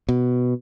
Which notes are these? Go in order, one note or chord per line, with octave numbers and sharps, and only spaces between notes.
B2